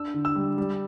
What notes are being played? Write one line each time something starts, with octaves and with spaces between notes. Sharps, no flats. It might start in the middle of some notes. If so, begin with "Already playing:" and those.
Already playing: D4 E6
D3
E6
G3
G3